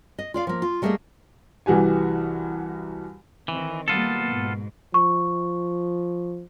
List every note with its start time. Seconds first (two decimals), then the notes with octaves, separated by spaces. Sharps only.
0.18 D#5
0.34 F4 D5 F5
0.47 F3 A#3
0.62 F4
0.82 G3 A3 A#3 G#4 D#5 E5
1.66 C2 E3 F#4 G4 G#5
3.48 D#3 E3 C4
3.88 F#3 G3 A#3 B3 F4 A4
4.29 G#2 B2
4.94 F3 C#6